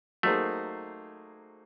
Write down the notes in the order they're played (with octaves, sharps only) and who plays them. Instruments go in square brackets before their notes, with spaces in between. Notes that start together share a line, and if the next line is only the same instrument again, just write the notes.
[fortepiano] F#3 A#3 D#4 G#4 C5 [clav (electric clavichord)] A3